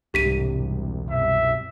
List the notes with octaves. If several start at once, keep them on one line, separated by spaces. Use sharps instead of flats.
E1 C2 G#2 D4 G4 B6 D#7
F#2 B2 E5